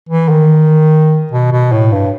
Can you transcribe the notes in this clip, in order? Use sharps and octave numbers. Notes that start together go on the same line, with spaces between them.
E3
D#3
B2
B2
A2
G2